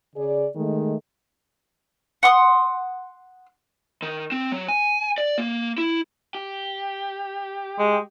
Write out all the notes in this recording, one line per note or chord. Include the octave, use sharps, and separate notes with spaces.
C#3 G#4 D5
D#3 G#3 A3
F#5 C6 D6 D#6
D#3
C4
F#3
G#5
D5
A#3
E4
G4
G#3